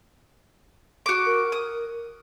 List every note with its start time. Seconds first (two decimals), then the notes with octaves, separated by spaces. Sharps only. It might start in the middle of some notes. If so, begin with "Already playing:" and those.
1.06 F#4 D6
1.26 A#4
1.52 D#6